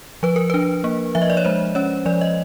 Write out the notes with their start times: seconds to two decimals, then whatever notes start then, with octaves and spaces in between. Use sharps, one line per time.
0.23 F3 B4
0.36 A#4
0.50 D4 B4
0.84 A#3
1.15 F3 E5
1.22 D#5
1.30 D5
1.37 C#5
1.45 G#3 C5
1.75 C#4 C#5
2.06 F3 D5
2.21 D#5